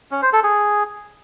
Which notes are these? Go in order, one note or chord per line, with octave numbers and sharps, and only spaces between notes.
C#4
C5
A4
G#4